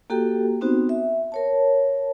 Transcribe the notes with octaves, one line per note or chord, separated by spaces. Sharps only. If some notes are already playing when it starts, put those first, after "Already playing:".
A#3 F#4 G4 A4 G5
B3 C4 D#4 F#4 C5
E5
A#4 C#5 A5